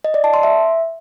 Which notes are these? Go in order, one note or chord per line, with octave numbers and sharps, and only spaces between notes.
D#5
D5
A5
C6
E5